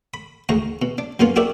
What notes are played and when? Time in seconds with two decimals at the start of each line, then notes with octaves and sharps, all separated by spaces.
0.14 B5
0.49 D2 G#2 A#5 C#6
0.82 B2
0.98 D4
1.19 F#2 A#2 A#3 B3 F4
1.36 F#4 G4 A#4 D5 E5